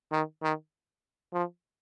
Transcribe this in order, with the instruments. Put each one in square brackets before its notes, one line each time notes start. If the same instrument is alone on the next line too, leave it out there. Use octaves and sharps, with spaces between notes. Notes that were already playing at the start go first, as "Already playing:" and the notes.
[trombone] D#3
D#3
F3